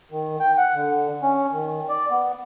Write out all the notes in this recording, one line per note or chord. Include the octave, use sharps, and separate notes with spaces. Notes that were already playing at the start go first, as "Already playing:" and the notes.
D#3
G5
F#5
D3
C#4
D#3
D5
B3